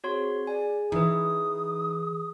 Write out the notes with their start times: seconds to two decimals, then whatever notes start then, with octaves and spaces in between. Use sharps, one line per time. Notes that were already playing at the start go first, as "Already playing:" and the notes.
0.04 C4 F#4 G#4 C5 C#5 C6
0.47 G#4 D5 G#5
0.92 E3 D#4 B4 D#6